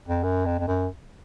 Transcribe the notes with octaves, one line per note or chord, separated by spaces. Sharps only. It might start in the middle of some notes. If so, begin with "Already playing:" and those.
F2
F#2
F2
F2
F#2